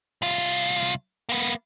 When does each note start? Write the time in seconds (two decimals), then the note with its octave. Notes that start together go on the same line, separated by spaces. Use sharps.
0.22 C2 F4
1.29 A#3 B3